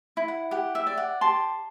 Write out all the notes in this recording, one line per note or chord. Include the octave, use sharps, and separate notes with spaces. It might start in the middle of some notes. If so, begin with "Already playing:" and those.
E4
F#5
G4 F#5
E5
D5
F#5
G4 A5 C6